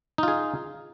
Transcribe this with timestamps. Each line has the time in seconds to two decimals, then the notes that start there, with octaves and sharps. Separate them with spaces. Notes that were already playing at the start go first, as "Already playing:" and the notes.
0.18 D#4
0.23 F4
0.28 G#4